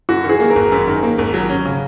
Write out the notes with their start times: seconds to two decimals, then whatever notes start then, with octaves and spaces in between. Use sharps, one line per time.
0.09 F#2 F#4
0.24 D#3
0.29 G#4
0.40 A#3
0.50 A#4
0.56 G#1
0.72 F#2
0.88 D#3
1.03 A#3
1.18 G#1
1.34 F#3
1.50 C#4
1.65 C#3